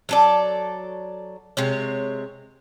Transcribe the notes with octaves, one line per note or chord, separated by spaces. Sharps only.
F#3 A4 D5
C3 G#3 C#5